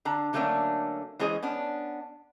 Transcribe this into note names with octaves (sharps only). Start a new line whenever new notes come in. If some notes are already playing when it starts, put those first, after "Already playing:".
D3 D4 A#5
D3 F#3 A3 A#3 C#4 D4
E3 G#3 C#4 G#4 C5 D#5
B3 C#4 D4